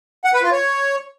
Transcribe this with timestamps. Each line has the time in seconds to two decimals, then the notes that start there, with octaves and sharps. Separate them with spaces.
0.25 F#5
0.34 B4
0.43 F4
0.51 C#5